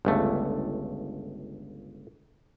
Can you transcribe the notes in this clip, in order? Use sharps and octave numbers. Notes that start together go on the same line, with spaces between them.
G1 C#2 A3